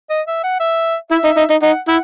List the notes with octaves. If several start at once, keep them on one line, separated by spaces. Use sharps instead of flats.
D#5
E5
F#5
E5
E4 E5
D#4
D#4
D#4
D#4 F#5
E4 F#5